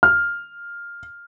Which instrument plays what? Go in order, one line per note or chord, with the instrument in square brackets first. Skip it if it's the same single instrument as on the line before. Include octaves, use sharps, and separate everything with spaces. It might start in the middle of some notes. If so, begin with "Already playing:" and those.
[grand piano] F6